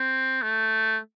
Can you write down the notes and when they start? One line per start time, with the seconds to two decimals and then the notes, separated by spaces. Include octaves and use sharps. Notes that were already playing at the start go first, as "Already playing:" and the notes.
Already playing: C4
0.42 A3